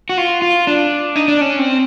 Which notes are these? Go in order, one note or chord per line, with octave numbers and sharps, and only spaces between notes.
F#4
F4
F4
D4
D#4
D4
C#4
C4